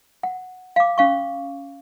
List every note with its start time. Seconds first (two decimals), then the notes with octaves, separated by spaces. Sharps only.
0.23 F#5
0.76 F5 D6
0.98 C#4 F5 C#6